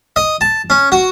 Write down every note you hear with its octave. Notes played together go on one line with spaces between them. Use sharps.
D#5
A5
C#4
F#4